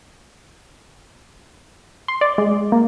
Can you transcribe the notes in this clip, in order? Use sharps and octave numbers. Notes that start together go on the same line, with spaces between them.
C6
D5
G#3
A#3